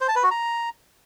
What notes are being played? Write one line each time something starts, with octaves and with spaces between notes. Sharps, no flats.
C5
A5
B4
F#4
A#5